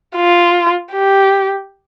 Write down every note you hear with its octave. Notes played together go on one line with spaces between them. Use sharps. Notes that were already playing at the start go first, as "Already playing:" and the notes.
F4
G4